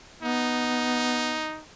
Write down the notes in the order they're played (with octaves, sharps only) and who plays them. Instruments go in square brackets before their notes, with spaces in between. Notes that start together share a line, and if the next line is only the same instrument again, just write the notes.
[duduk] B3 [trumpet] D#4